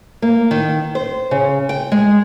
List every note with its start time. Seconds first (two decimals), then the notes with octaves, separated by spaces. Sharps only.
0.22 A#3
0.51 D#3
0.95 C5
1.31 C#3
1.69 G5
1.92 G#3